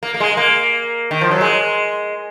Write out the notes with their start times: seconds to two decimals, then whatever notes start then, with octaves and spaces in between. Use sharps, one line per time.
0.03 A#3
0.14 A#3
0.20 G#3
0.37 A#3
1.11 D#3
1.21 F3
1.31 F#3
1.41 G#3